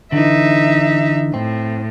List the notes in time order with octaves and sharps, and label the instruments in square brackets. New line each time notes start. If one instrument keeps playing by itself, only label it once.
[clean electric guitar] D3 E3 [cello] D#4 E5
[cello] A2 [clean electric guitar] C4